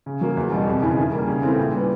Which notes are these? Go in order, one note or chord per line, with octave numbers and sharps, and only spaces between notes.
C#3
F#3 A#3
E2
B2 G3
F2
C#3 E3
D#3
G3 A#3
C#3
E3 A3 C4
A#2
G3 B3